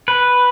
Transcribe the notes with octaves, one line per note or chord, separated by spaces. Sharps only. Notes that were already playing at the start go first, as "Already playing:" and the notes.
B4